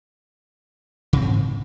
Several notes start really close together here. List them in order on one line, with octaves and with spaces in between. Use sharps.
C#3 C4 G#2